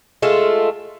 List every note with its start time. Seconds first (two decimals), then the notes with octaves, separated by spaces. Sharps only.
0.22 G#3 A3 F4 A4